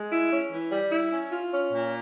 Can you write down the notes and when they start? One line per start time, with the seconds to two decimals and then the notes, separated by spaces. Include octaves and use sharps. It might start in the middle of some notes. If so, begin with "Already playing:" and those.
Already playing: G#3
0.11 E4
0.31 C#4
0.50 E3
0.71 G3
0.91 E4
1.11 C#4
1.31 F4
1.52 C#4
1.72 A#2